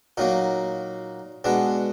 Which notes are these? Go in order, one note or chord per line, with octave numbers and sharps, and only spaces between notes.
A#2 F#3 A#3 D#4
B2 G#3 B3 D4